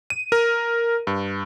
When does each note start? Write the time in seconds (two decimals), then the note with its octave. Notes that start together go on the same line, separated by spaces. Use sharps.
0.10 D#7
0.32 A#4
1.07 G2